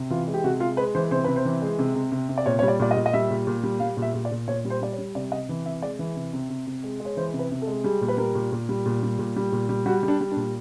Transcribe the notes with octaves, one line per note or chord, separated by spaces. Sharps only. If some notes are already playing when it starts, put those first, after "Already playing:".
Already playing: C3
E3 F4
G#3
G4
C3 F#4
G#3 F4
G#3 B4
E3 C5
C3 C5
C3 B4
C5
E3
G#3
C3
C3
C3
C3
D5
A#2 C#5
G3 C#5
D5
A#2 D5
D#5
A#2
D#5
G3 E5
A#2
A#2
G3
G3 F5
A#2
E5
A#2
D5
A#2
A#2 C#5
G3
C5
G3 D5
C#5
G3
C3 D5
C3 D#5
E3
C3 E5
G#3 D5
E3
C3
C3
C3
C3
G#3
G#3
C#5
E3 C5
C3
B4
C3
A4
G#3
G3 G#4
A#2
B4
G3 A#4
A#2
A#2
G3
A#2
G3
A#2
G3
A#2
G3
G3 F#4
G3
D4
G3
D4
A#2